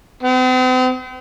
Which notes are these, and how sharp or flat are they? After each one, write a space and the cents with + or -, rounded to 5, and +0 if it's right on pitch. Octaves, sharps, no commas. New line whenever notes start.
C4 -45